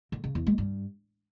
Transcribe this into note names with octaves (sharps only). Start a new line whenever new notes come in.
D3
C#3
E2
G#3
G2